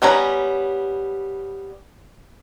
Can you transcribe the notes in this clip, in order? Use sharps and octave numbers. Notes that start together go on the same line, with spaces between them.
G3 B3 C#4 A#5